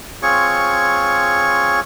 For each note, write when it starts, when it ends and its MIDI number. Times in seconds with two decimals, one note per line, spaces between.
0.22 1.80 60
0.22 1.80 65
0.22 1.80 68
0.22 1.80 73
0.22 1.80 85